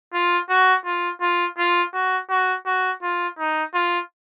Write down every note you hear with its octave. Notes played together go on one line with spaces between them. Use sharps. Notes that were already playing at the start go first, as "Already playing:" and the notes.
F4
F#4
F4
F4
F4
F#4
F#4
F#4
F4
D#4
F4